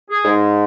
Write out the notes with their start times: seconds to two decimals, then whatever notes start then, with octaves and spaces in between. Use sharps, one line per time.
0.09 G#4
0.23 G#2